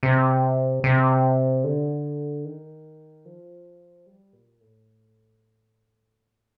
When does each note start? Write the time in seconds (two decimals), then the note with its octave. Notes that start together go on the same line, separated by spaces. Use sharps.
0.03 C3
0.84 C3
1.64 D3
2.45 D#3
3.25 F3
4.07 G3
4.33 A#2
4.60 A2